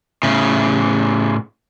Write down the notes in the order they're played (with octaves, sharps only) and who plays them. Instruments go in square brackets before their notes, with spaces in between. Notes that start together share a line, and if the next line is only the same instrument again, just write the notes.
[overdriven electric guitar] A2 C#3